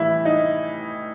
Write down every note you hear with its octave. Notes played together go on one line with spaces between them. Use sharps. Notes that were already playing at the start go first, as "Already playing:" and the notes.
Already playing: A2 E3 G3 E4
D#4